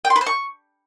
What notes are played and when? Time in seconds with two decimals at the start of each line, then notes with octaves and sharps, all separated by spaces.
0.05 G5
0.10 C6
0.16 B4
0.21 C5
0.27 C#6